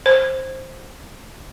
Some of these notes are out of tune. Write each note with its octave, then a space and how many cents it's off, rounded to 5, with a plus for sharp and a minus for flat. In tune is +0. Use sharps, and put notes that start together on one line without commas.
C5 +10